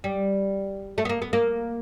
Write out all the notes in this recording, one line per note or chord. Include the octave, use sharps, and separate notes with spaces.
G3
A3
B3
A#3
B3
A#3